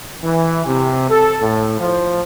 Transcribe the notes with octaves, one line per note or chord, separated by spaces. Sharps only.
E3
C3
A4
A2
F3